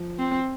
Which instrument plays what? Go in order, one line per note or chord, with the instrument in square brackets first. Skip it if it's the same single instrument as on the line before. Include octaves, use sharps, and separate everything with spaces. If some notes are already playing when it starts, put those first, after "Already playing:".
Already playing: [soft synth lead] F3
[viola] C4